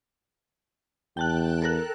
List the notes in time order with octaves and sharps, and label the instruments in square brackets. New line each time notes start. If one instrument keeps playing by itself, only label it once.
[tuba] E2 [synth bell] G5 A5 F#6
[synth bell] A4 A#4 F#6